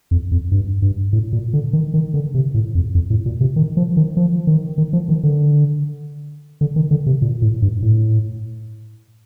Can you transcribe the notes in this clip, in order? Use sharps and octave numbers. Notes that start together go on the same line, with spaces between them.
F2
F2
G2
G2
A2
A#2
D3
D#3
D#3
D3
C3
A2
F2
F2
A2
A#2
C3
D#3
F3
D#3
F3
D#3
D#3
F3
D#3
D3
D3
D#3
D3
C3
A#2
A2
G2
A2